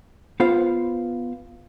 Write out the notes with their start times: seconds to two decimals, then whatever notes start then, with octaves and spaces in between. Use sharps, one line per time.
0.40 B3 F4 C5 F5